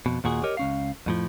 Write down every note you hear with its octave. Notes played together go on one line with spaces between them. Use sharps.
F2 B2
D#2 A#2 F#4 G#4
G4 A#4 C#5 D#5
C#2 C#4 F5
F2 A2 F3